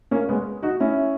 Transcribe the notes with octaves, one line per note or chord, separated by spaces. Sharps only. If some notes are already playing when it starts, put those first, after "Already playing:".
A#3 C#4
G#3 B3
D#4 F#4
C#4 E4